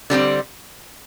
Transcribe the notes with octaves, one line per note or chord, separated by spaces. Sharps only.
D3 G3 C4 G4